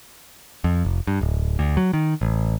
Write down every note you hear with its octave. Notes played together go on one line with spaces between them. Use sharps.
F2
F1
G2
D1
D2
F#3
D#3
A1